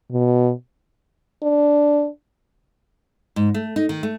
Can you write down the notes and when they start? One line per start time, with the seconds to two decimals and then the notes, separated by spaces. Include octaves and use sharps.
0.12 B2
1.43 D4
3.36 G#2
3.54 A3
3.76 D#4
3.89 D#3
4.03 A3